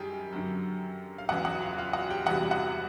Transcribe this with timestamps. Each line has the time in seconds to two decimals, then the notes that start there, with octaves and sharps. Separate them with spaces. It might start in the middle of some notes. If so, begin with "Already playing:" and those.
Already playing: F#2 D#3 G3 G4 G#4 G5 G#5
0.33 F#2 D3 F#3
1.18 F5
1.29 E2 C#3 E3 F#4 F#5
1.45 F#4 F#5
1.62 F4 F5
1.78 F4 F5
1.93 F#4 F#5
2.10 G4 G5
2.26 E2 C3 E3 G3 F#4 F#5
2.51 F#4 F#5